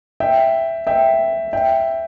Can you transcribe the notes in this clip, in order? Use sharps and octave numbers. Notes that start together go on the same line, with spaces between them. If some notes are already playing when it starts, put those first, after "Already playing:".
E5 G5
E5 G5
E5 G5